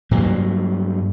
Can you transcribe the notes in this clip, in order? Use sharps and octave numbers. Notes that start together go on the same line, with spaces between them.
G2 F#3 A#3